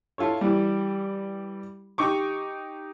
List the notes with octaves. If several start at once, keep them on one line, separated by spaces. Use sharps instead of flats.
E4 F4 A4 C#5
E3 G3
D#4 G4 C#6 D6